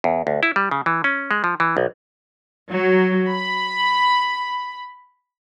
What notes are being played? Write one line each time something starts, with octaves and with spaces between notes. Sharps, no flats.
E2
D2
E4
G3
C#3
E3
C#4
G#3
F3
E3
B1
F#3
B5